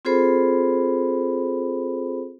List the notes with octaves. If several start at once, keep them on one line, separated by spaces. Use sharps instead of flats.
C4 F4 G#4 A4 C5 B5